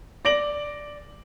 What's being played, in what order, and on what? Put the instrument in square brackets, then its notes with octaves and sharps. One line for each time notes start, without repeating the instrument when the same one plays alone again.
[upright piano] D5 A#6 D7 F#7